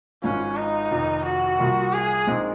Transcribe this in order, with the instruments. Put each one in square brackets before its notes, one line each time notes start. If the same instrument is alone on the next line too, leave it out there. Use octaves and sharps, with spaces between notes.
[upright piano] G#1 G#2 F3 [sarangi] C#4
[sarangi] D#4
[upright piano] F1 F2 D#3
[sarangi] F#4
[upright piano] C2 A#2 F3 A#3 F4
[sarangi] G#4
[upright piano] A#1 A#2 G#3 C4 D#4